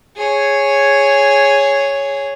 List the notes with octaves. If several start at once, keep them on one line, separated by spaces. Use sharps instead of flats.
G#4 C#5